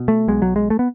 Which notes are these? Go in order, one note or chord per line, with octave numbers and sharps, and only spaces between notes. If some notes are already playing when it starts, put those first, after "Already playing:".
Already playing: B2
A3
B1 B2 G#3
F#3
G#3
A3
B3